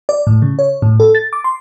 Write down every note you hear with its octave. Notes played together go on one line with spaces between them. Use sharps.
D5
A2
C#3
C#5
A2
A4
A6
D6
C6